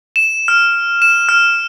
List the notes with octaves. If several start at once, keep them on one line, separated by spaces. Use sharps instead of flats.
E7
F6
E7
F6